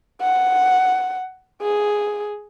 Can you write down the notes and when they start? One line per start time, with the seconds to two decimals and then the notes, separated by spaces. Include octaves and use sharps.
0.21 F#5
1.62 G#4